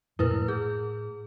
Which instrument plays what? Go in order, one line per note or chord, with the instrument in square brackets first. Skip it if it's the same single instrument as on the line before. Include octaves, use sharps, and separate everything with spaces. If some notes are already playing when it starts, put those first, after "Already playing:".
[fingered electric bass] F2 A#2 [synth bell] E4 A#4 B4
[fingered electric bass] A2
[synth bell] G#4